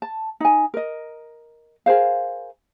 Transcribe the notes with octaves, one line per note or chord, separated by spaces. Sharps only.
A5
D#4 G#5
A#4 D#5
G#4 A#4 C5 F5